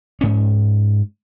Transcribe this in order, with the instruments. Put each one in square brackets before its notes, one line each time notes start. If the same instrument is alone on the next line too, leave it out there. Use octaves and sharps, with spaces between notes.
[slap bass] G#2 C#4